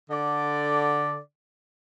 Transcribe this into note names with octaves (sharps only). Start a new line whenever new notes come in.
D3 D5